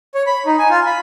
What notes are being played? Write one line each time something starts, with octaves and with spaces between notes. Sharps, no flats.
C#5
B5
D#4
G#5
F4
B5